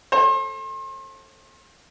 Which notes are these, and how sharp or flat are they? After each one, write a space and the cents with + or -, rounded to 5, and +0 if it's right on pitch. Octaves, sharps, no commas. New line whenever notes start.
A4 +0 C5 +40